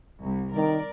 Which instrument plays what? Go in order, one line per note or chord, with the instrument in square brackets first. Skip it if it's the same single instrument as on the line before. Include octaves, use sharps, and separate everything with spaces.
[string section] C2
[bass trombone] D#3 [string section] A#4 D5